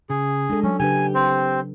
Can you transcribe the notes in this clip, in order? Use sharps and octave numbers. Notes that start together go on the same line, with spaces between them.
C#3 G#4
G#3 D4 A4
F#3 C#4
C#3 D4 G4 B4 G#5
C4 C5